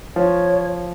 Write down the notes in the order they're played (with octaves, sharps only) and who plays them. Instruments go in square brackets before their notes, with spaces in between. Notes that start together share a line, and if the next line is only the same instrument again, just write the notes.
[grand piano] F3 [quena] C#5